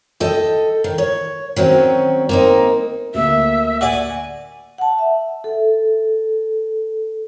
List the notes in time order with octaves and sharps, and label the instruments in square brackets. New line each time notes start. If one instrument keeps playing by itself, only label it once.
[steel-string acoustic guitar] A4 D#5 G5
D#3
C#5
D#3 F#3 C4 C#4
A#3 C4 D#4
[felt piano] D2 A#3 [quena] E5
[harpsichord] F#4 D5 D6 [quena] G#5
[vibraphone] F#5 A5
E5
A4